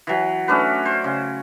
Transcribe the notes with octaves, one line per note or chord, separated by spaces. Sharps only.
E3 F#3
A3 C#4 D4 B4
C5
C#3